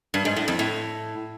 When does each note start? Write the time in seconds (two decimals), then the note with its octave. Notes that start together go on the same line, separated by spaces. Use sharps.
0.14 G2
0.25 G#2
0.36 A2
0.48 F2
0.59 A2